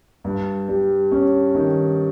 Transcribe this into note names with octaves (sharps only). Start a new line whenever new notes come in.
G2
G3
C#4
D#3